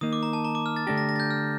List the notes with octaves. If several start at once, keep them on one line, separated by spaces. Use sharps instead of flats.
D#3 A#3 D#4 D#6
D6
A#5
A5
A#5
D6
F6
A6
D3 A3 D4 G4 A#6
A#6
A#6
A6
G6
F6